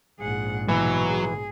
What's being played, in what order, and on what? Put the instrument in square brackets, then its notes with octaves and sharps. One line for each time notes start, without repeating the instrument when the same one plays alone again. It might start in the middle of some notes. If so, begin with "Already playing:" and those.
[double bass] A#1 G#2 [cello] G#4 F#5
[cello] B2 [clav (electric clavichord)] E3 [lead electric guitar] F#3
[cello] G#4